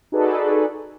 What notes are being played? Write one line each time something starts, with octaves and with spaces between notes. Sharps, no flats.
D#4 F#4 G#4 A4 B4 D5